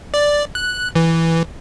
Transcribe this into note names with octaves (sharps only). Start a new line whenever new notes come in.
D5
F#6
E3